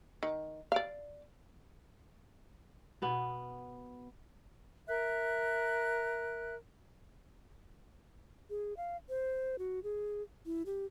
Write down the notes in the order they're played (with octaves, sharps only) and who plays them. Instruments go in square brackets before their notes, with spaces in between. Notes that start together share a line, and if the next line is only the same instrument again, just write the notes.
[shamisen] D#3
D5 F5
[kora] B2 B3
[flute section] A#4 E5 F#6
[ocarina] G#4
F5
C5
F#4
G#4
E4
G4